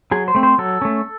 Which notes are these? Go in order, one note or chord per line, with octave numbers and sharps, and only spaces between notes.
F#3 G#4
C5
A3 C4
C5
F#3 A4
A3 C#4